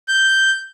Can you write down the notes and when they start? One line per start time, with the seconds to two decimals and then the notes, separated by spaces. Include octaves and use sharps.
0.08 G6